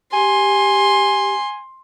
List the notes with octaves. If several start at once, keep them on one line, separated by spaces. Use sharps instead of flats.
G4 G#5 C6